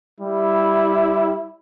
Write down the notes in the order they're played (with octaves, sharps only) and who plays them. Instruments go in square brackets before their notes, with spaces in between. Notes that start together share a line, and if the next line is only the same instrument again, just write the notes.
[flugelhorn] G3 [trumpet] E4